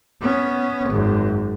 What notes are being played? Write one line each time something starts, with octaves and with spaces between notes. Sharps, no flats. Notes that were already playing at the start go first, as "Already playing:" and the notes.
B3 C#4
G#1 F#2